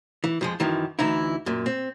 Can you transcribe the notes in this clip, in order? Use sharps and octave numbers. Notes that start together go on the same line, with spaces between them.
E3
F2 F3 G#3
F#2 D#3 E3
D2 E3 D#4 E4
F#2 A#2
C4